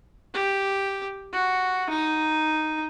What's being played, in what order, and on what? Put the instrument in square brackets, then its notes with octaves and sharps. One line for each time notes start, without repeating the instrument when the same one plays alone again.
[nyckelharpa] G4
F#4
D#4